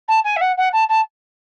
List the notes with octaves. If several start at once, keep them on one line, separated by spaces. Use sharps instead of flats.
A5
G#5
E5
F#5
F#5
A5
A5